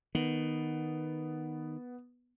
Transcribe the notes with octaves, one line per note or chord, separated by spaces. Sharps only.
D#3 B3